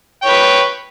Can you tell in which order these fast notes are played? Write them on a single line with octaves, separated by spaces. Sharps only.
G5 C#5 B4